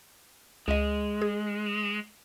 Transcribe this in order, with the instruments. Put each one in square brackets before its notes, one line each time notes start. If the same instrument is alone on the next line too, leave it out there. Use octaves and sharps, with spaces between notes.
[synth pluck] C#2 D#5 [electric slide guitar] G#3
[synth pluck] G#4